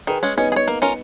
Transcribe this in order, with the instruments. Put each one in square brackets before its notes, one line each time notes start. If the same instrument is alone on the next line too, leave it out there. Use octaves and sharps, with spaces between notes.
[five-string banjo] D#3 [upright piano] G#4 B4
[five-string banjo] G#3 C#4
[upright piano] B3 D#4 [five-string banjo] C#4
[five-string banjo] G#4
C#5
A#3
C#4 F4 A#4